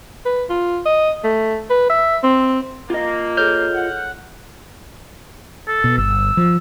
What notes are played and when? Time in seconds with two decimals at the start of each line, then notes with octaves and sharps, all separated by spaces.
0.25 B4
0.49 F4
0.85 D#5
1.24 A3
1.70 B4
1.89 E5
2.23 C4
2.90 A#3 F4 D#5
3.37 G#4 A4 C#5 F6 G6
3.74 F#5
5.68 A4
5.84 B2
5.98 G1 E6
6.37 F3